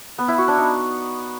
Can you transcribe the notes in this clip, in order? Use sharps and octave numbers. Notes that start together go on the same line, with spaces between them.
B3
E4
F#4
D4
D#4